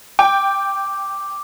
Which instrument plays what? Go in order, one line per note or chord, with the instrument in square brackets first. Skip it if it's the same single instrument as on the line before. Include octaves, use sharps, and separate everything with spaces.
[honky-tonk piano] G5 [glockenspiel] D6